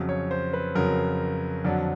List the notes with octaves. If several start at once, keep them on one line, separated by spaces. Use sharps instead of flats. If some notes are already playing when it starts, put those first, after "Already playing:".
Already playing: F2 C#3 F#3
C#5
C5
B4
F2 C#3 F#3 A#4
F2 D3 F#3 D5